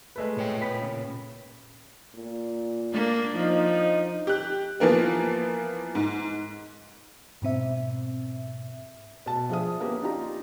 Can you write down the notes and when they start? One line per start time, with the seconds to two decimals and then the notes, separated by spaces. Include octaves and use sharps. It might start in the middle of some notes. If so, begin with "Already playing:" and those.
0.16 G#3 A3 B4
0.37 A#2 C#5 G5
0.62 B3 B5 B6
0.82 C#3
2.14 A#2
2.93 A#3 D4
3.36 F3 D#4
4.27 G4 F#6
4.80 E3 F3 A#3 B3
5.95 G#2
7.42 G#2 B2 C4 E5
9.26 B2 A5
9.49 F3 D4 G#4 E5 D#6
9.81 A#3 B3 C#4 G4
10.02 D4 D#4 F4 G4 A#5